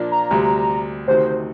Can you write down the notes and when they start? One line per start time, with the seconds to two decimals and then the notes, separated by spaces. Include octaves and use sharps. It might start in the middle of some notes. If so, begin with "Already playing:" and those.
Already playing: A#2 F3 A#3 D4
0.12 A#5
0.31 D2 C3 G3
1.08 D2 C3 D#3 C5